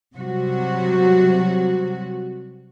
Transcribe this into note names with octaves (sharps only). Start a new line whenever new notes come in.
C3 F#3 G3 F#4